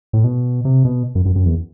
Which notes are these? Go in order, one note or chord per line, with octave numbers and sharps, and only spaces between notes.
A2
B2
C3
B2
F#2
F#2
F#2
E2